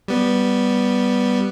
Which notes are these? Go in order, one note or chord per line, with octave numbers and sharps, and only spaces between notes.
G3 B3